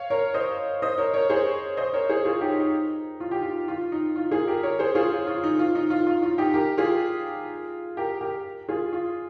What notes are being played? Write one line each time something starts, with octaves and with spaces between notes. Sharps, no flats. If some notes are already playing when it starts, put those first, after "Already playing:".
Already playing: C#5 F5
A#4 C#5
C5 D#5
C5 D#5
A#4 C#5
A#4 C#5
G#4 C5
C5 D#5
A#4 C#5
G#4 C5
F4 G#4
D#4 G4
D#4
F4
G4
F4
F4
D#4
F4
F4 G#4
G4 A#4
A#4 C#5
G#4 C5
F4 G#4
F4
F4
D#4
F4
D#4
F4
F4
F4
D#4 G4
G4 A#4
F4 G#4
G4 A#4
G4 A#4
F4 G#4
F4